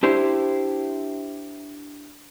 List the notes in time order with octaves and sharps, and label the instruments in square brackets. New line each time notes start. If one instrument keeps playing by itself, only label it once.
[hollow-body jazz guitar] D4 E4 G4 C5